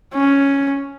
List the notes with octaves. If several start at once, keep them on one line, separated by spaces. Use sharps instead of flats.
C#4